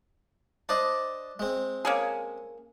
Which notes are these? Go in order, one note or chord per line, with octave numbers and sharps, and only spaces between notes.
D4 C5 D5 D#5
G#3 C4
A#3 C#4 G#4